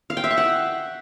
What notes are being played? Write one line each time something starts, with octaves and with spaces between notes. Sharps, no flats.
F5
G5
E5
C#6
F#5